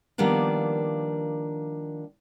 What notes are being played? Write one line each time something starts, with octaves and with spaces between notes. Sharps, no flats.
D#3 F3 G3 A#3 B3 D4